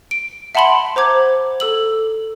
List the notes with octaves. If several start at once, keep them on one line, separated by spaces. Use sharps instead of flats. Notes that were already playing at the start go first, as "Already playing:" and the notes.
D7
E5 F#5 A5 B5 C6 F#7
C5 A#5 D6 G#6
A4 E6 F#7